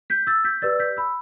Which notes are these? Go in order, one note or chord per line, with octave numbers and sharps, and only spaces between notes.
G6 B6
E6 A6
G6 B6
G4 B4 D5 E6 A6
G6 B6
B5 E6